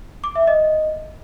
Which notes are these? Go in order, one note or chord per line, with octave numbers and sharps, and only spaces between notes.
D6
E5
D#5